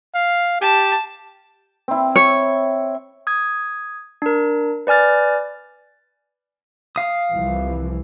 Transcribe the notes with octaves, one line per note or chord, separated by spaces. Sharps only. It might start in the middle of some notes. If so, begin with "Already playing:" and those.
F5
G4 A5
C4 E4
C#5
D#6 G#6
D4 A#4
B4 D5 G#5 F6 A6
F5 D#6
C2 E3 F3